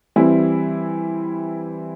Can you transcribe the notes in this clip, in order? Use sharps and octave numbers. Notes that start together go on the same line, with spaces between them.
E3 G3 C4 E4